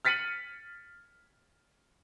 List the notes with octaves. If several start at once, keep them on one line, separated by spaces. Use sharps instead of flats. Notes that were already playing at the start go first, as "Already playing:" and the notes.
F6 A6 B6 C#7 D#7 F#7